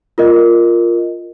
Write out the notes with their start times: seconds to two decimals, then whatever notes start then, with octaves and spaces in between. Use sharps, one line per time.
0.18 F4 A#4 D#5